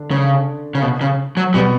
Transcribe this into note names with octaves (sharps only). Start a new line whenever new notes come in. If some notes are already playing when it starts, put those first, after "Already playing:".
Already playing: D3 D4
C#3
C#3
B2
C#3
F#3
B2 G3 B3